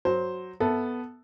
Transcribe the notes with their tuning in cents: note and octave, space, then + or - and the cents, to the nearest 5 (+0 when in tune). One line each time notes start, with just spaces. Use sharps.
F#3 +0 C5 +0
B3 +0 A4 +0 E5 +0